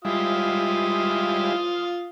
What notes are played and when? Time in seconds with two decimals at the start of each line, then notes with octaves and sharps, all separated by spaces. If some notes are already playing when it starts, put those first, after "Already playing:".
0.05 G3 G#3 E4 F4 F5 D#6